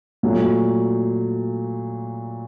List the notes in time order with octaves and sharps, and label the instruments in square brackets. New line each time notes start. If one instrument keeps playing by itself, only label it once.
[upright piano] A#2 F#3 A3